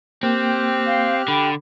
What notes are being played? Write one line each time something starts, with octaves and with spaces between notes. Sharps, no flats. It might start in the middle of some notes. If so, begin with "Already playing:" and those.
A#3 C4 G4 F6 F#6
F5
D3 G5 B5